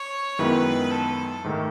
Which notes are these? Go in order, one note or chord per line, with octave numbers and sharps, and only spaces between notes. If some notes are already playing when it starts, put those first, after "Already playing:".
Already playing: C#5
F#2 D#3 G#3 B3 E4 B4
A4
G#2 D#3 A3